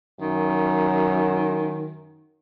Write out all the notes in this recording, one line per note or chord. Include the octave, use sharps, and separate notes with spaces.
F#2 D#3